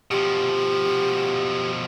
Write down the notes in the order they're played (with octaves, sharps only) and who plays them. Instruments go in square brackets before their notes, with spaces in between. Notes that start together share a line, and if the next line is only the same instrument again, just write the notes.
[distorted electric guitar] B2 F3 [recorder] G4